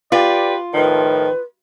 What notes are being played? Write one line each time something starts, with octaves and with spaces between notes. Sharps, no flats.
F4 G4 B4 D5
A2 D#3 F3 B4